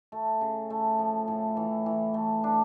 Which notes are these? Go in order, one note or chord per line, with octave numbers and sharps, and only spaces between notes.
A3
C#3
A3
F3
A2
E3
E3
A3
D4